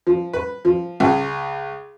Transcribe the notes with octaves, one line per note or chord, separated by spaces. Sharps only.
F3
B4
F3
C#2